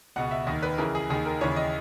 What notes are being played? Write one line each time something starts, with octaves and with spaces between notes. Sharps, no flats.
C#2 B2 F#5
E5
D#2 D#3 D#5
B4
C#2 C#3 E3 A#4
G#4
D#2 D#3 G#4
A#4
D#2 C#3 E3 C#5
D#5